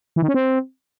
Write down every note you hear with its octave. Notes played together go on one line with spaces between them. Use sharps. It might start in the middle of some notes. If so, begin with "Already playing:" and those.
E3
D#3
C#4
C4